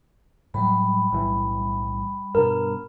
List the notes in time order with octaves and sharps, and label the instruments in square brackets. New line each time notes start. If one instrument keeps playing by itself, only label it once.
[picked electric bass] A2 F#3 [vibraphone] G3 B5
[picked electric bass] B1 A2 E3
[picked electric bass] G2 B2 [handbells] A#4